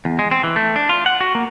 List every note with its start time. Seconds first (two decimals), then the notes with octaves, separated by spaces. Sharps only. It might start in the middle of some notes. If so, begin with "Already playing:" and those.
0.05 E2
0.19 G#3
0.31 C4
0.43 E3
0.56 A3
0.76 D4
0.89 F4
1.06 F#5
1.21 F#4
1.35 A#3